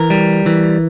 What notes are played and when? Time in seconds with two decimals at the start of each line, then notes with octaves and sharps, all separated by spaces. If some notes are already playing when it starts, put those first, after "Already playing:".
Already playing: E3 A#4
0.10 G3
0.46 E3